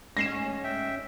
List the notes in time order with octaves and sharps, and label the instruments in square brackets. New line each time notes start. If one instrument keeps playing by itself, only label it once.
[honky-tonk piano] A1 G#2 [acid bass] C#4 [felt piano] A#6 C7 E7
[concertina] E5 G5